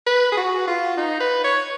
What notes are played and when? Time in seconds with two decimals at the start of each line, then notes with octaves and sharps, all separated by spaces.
0.07 B4
0.32 G#4
0.37 F#4
0.68 F4
0.97 D#4
1.20 B4
1.44 C#5